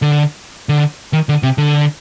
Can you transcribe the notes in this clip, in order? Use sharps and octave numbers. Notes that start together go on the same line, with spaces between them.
D3
D3
D#3
D3
C3
D3